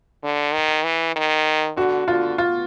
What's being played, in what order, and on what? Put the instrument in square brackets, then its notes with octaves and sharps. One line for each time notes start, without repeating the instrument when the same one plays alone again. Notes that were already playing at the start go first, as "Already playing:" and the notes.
[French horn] D3
D#3
E3
D#3
[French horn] D3 [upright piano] F#4
[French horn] D3 [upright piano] F4
[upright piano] F4